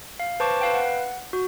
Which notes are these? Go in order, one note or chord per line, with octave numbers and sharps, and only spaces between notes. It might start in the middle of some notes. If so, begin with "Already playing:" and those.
F5
B4 C5 A5 C#6 D6
B4 F5 G5
F#5
F#4